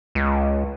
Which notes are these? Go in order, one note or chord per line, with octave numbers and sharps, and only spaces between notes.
C#2